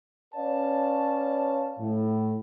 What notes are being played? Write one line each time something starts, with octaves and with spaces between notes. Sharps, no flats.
C#4 B4 C#5 D5 F5 A5
A2